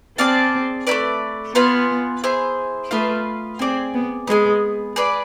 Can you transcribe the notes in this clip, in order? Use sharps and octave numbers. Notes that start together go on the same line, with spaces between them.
C4 G#4 D5 F5 A5
A3 E4 B4 D5
B3 F4 B4 F5 G#5
E4 G#4 C5 G#5
A3 B3 F4 B4 F5
C4 G#4 D5 G#5
B3
G#3 B3 D4 G#4
G#4 B4 D5